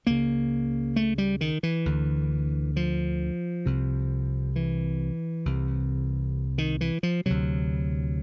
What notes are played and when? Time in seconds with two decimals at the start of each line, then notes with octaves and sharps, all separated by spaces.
0.06 C#2 C#3 A#3
0.96 A3
1.18 G3
1.41 D#3
1.63 E3
1.86 D2 D3
2.76 F3
3.66 C2 C3
4.56 E3
5.45 C2 C3
6.58 D#3
6.81 E3
7.03 F3
7.26 D2 C3 F#3